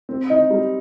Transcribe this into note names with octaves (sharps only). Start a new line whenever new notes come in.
C4
D#4
G3